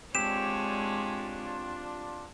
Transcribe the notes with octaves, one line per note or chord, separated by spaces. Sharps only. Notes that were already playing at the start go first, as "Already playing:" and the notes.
G#3 C4 D4 F4 G4 C#5 E7